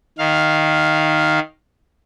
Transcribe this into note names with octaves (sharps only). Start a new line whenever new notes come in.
D#3 F5